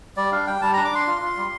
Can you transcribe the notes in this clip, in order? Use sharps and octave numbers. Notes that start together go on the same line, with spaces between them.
G3 D5
D4 F5
G3 G5
G3 A5
D4 A#5
D6
D4 C6
F4
F4
G3